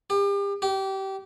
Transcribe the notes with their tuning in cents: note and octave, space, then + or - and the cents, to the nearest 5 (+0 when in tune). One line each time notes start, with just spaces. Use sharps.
G4 +35
G4 -25